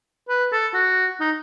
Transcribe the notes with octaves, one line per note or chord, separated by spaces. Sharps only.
B4
A4
F#4
D#4